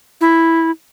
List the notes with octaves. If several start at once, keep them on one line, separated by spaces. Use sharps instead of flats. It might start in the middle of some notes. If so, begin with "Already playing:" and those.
E4